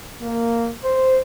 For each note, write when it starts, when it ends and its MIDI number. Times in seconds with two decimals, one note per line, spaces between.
0.22 0.70 58
0.85 1.22 72